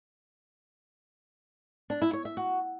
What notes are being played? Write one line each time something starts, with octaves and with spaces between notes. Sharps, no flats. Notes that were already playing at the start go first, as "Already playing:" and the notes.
D4
E4
C#5
E5
F#4